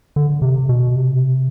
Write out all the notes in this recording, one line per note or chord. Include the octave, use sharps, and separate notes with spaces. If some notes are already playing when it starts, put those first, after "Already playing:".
D3
C3
B2
C3